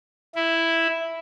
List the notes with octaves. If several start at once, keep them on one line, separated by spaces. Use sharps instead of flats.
E4